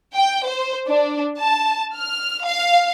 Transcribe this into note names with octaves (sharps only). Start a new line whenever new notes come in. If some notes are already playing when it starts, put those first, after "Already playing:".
G5
C5
D4
A5
F6
F5